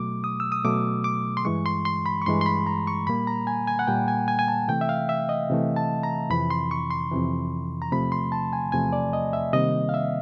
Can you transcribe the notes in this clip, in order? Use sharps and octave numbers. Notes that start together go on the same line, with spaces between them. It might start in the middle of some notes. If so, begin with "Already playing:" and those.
Already playing: B2 F#3 A3 D6
D#6
E6
D#6
B2 F#3 A3 D6
D6
C6
G2 E3 G#3 C#6
C6
C6
B5
C#6
G2 E3 G#3 C6
C6
B5
A#5
C#6
A#2 G3 A#3 B5
A#5
G#5
G#5
F#5
A#2 G3 A#3 G5
G#5
G#5
G#5
A5
C3 E3 A3 G5
E5
F5
E5
D#5
C3 E3 A3
A5
A#5
F2 C3 E3 B5
C6
C#6
C6
F2 C3 E3
A#5
E2 C3 F3 A3 B5
C6
A5
G#5
E2 C3 F3 A3 G#5
D5
D#5
E5
C3 D#3 G3 A#3 D#5
F5
E5